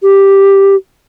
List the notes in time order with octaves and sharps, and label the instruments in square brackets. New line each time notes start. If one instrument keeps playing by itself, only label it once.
[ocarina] G4